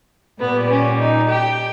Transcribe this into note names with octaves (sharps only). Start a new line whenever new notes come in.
A#2 G3 B3
C#4
D#4
G4